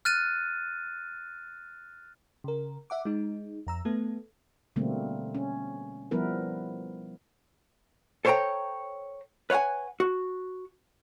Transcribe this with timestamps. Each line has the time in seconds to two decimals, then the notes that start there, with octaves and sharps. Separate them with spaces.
0.05 F6 F#6 A6 D#7
2.44 C#3 A#4
2.90 E5 F#5 D6
3.05 G#3 D#4
3.67 F2 A#5 E6
3.85 A3 B3 A4
4.76 B2 D3 G3 A3 A#3 C4
5.35 C#4
6.11 F3 G3 B3 E4 A#4 B4
8.25 A4 C5 C#5 E5 G5 A#5
9.50 B4 C#5 F5 F#5 G#5
10.00 F#4